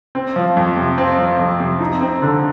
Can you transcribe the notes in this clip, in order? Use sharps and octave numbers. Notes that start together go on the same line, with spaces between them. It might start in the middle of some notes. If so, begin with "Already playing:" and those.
C4
F3
F2
C3
C4
F3
F2
C3
D#4
C4
D3